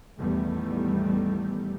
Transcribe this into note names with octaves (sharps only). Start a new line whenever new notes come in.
E2 A2 D#3 G3 A3